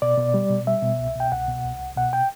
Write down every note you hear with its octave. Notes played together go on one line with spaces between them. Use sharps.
B2 D5
B2
G3
B2
G3 E5
B2
C2
B2 G5
C2 F#5
B2
C2
C2
B2 F#5
G5